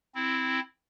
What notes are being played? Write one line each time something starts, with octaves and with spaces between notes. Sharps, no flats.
C4 E4